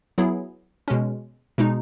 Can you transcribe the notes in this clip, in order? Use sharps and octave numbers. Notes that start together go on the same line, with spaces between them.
F#3 B3 E4 G#4
B2 G#3 C#4
B2 G#3 D#4